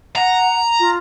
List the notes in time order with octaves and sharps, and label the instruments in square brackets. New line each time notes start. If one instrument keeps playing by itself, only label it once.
[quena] F#5 [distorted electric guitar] A#5
[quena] F4